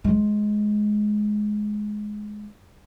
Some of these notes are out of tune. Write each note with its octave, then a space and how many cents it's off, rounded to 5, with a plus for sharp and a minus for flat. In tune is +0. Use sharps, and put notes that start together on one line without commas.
G#3 +15